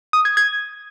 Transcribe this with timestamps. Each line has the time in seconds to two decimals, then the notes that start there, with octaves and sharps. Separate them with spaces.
0.13 D#6
0.25 G#6
0.37 G#6